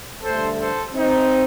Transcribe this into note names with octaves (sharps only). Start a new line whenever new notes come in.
G2 D3 A3 A4 C5
A4 C5
C4 D#4